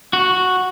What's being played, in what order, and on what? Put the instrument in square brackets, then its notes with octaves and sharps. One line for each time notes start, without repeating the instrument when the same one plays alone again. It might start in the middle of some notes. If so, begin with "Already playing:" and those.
[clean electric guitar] F#4